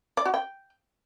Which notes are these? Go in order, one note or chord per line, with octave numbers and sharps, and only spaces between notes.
D5
F#4
G5